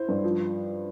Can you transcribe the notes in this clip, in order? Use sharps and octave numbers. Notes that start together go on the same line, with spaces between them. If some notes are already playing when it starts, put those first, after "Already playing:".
Already playing: E4 C5
G2
F3